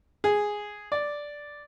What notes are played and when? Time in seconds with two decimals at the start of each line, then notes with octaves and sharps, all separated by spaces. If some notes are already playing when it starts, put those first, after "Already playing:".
0.24 G#4
0.92 D5